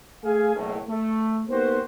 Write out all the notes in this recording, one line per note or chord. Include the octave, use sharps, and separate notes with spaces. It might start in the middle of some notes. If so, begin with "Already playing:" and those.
A3 G#4 F5 G#5
F#1 B1 A2
A3
A#3 B3 D#4 F#4 G4 C5